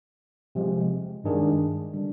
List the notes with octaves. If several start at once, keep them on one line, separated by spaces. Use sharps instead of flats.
C3 F3 G#3
G2 D#3 G#3 D4 G#4
D3 G3 D4